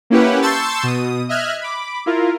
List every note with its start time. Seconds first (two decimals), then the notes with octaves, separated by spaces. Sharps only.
0.10 A#3 C#4 E4 G4 B4 F#5
0.42 A5 C6 C#6 E6 G6 A6
0.83 B2 D#6
1.29 D#5 E5 F6 F#6 G#6
1.61 B5 D6
2.06 E4 F4 A#4